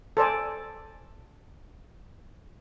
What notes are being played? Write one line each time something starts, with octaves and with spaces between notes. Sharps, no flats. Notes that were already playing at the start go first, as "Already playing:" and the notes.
A4 C5 D5 G#5